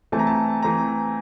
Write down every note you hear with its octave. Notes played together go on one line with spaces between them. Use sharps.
E3 A3 C4 A5
A#5
A5
E3 A3 C4 A#5